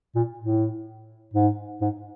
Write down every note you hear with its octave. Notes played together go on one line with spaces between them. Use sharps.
A#2
A2
G#2
G#2